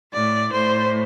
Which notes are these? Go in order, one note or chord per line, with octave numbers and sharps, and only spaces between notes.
A2 D5
A2 C5